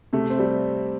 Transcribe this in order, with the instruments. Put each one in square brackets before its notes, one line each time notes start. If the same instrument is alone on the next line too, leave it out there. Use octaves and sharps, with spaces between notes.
[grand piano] C3 [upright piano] A3
[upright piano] C4
[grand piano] G3